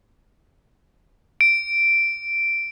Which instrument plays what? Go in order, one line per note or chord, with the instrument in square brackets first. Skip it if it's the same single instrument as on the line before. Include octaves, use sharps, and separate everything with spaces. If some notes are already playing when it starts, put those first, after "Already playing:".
[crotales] D7